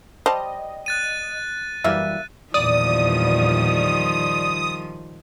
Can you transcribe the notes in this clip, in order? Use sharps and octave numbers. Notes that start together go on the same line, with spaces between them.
G3 C5 D#5 A5
F#6 A6 D#7
F#2 E3 G3 A#3 E5
E2 A#2 D#3 F3 G3 D5 D#6